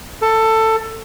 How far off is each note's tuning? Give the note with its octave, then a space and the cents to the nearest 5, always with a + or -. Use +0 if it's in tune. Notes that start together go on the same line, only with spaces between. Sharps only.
A4 +15